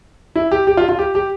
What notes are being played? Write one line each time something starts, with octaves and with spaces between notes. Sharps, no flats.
E4
G4
G4
F4
F4
G4
G4